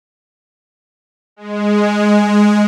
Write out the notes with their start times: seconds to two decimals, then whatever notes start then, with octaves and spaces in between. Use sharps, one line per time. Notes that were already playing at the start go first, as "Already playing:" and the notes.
1.36 G#3